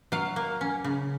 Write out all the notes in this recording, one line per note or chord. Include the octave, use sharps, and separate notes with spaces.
F#3 F5
A#3
C#4
C#3